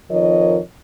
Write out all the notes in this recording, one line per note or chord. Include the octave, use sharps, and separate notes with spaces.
F2 D#3 F3 A#4 C#5 D#5